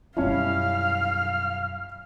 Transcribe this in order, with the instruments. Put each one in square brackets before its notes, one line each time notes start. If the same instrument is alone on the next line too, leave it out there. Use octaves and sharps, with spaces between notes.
[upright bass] F#2 B2 [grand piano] G3 C#4 E4 [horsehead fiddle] F5 [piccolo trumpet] F6